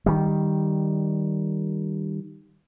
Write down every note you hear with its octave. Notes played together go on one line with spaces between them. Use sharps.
D#3 G3